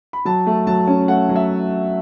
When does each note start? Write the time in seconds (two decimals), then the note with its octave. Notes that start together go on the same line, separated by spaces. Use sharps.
0.13 B5
0.25 F#3 A5
0.47 A3
0.67 F#3 A5
0.87 C#4
1.08 A3 F#5
1.29 F#3
1.36 E5